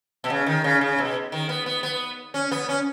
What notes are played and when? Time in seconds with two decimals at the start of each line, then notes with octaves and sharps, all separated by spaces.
0.24 B2
0.30 C#3
0.46 D#3
0.64 C#3
0.81 C#3
0.99 B2
1.32 D#3
1.49 B3
1.66 B3
1.83 B3
2.34 C#4
2.51 B3
2.69 C#4